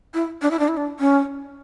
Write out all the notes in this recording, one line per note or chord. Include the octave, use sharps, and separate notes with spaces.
E4
D4
E4
D4
E4
D4
C#4